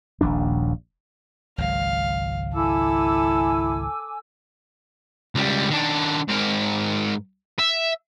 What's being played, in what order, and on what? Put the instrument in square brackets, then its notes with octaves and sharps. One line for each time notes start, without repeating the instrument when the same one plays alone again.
[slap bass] D#1 A#1 D#2 D4
[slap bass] G#1 C#2 F#3 [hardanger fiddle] F5
[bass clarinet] E4 [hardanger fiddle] A4 [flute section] G#5 D6 E6
[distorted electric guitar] C#2 G3
D#3 D4
G#2 A#4
E5